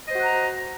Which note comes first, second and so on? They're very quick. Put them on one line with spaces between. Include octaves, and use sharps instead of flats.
D#5 C5 F#4 F#5 A#5